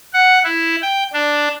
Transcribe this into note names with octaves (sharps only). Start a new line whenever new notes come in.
F#5
E4
G5
D4